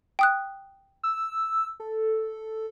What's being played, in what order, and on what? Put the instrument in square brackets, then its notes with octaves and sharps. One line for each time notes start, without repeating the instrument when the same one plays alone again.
[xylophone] G5 D#6 F#6
[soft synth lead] E6
A4